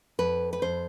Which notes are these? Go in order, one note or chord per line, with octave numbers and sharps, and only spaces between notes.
F2 B4
B4
F2 C5